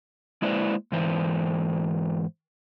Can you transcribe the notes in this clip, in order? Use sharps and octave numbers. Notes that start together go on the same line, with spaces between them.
G#3 A#3 E4 B4 C5 D5
G#2 E3 C5